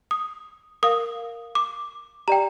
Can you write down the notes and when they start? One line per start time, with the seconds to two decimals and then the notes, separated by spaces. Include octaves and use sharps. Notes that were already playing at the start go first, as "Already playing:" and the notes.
0.11 D#6
0.83 A#4 F5 D#6
1.55 D6
2.28 G4 D5 G5 A#5